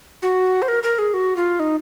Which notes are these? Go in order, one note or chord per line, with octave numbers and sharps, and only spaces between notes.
F#4
C5
A#4
A#4
G#4
F#4
F4
D#4